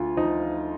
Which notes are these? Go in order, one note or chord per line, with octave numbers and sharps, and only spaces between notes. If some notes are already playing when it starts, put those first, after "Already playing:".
Already playing: D2 D3 F4
F3 D#4